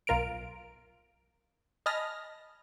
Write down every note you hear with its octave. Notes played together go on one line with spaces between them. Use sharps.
B1 F4 A#4 F6 D7
D#5 G#5 A5 B5 F6 A#6